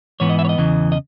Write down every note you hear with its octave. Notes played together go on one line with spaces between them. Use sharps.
G#2 E3 B3 C#5
D#5
E5
C#5
D#5
E2 C#3 E3
D#5